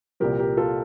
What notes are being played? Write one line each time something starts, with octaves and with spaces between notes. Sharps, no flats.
C2 A#2 F3 G4 A#4
G4 A#4
F4 A4